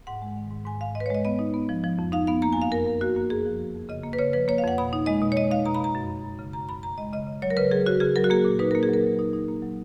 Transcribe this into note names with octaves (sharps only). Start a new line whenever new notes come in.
G#2 F#5
G#3
D#3
G#2
G#2 G#5
G#2 F5
G#2 D#5
B4
C#5
G#3 D#5
B3 D#5
D#4
B3
F3
F3
F2
D#4 F5
B3 F5
A#3 A#5
G#5
F#2 F5
F#2 A#4
F#2
A#3 F#4
A#3
F#2 G#4
F3
F2
F2
C#3 D#5
A#3
B4
C#3 C#5
F3 B4
A#3 C#5
F5
F2 F#5
B2 B5
D#4
G#3 D#5
B2
C#5
G#3 D#5
D#4 F5
B2 A#5
B5
B2 A#5
F#2
F#2
F#2
C#3
F#2 A#5
F#2 B5
C#3 A#5
G#3 D#5
C#3 D#5
C#3
F#3 C#5
A#4
C#3 B4
F#3 G#4
C#3 F#4
C#3 G#4
F#3 A#4
F#4
A#3 G#4
A#2
D#4 B4
A#3 A#4
G#4
F#3 A#4
F#3
D#4
D#4
A#3
F#3